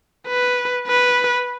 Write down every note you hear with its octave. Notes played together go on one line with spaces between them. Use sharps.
B4
B4